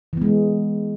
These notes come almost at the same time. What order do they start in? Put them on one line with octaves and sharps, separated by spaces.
E3 B3 G#3